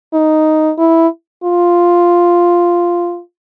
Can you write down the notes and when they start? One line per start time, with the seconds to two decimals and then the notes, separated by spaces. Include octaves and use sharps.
0.13 D#4
0.78 E4
1.44 F4